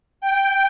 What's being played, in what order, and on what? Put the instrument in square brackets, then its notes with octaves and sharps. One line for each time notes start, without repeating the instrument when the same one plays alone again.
[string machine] G5